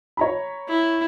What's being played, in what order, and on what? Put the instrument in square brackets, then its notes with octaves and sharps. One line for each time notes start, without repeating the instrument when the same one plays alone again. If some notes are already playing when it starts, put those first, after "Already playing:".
[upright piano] C#5 A#5 B5
[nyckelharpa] E4